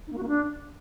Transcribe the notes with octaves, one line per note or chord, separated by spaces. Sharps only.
D#4
A#3
F#4
A#3
D4